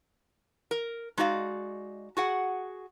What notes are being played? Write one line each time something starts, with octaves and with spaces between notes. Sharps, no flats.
A#4
G#3 D#4 F#4 D5 F5
F#4 G#4 F#5